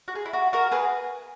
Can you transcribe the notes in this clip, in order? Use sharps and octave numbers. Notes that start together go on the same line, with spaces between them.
F#4
G#4
E4
F#4
F#4 A#4
G#4 B4